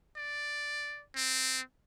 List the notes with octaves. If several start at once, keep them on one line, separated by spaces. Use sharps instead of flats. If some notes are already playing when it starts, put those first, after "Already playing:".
D5
C4